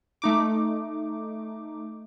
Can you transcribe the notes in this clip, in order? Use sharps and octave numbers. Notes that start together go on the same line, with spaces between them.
A3 D#4 D6